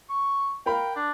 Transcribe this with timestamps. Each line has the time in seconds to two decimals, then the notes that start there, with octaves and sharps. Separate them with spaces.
0.10 C#6
0.66 A#4 F5 G5 B5
0.96 D4